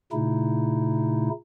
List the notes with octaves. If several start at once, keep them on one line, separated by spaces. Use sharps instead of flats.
A#2 C#3 A3 D#4 E4